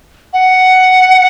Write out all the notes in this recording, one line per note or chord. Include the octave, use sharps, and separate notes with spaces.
F#5